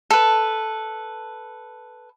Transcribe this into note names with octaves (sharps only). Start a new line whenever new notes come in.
A4 B4